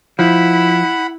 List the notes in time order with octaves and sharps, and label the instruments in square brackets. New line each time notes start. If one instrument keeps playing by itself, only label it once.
[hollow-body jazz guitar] F3 [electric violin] E4 [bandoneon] F#5 B5